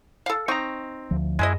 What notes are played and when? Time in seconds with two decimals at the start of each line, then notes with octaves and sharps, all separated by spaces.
0.26 A4 F5
0.48 C4 D#4 A#5 C#6
1.11 D2 F3
1.39 F#2 G#3 E4 G#4 D#5